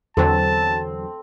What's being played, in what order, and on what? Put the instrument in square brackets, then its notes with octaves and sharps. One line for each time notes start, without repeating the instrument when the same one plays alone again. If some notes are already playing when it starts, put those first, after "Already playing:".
[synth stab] E2 D3 F#3 [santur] C4 C5 [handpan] A4 [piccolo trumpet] A5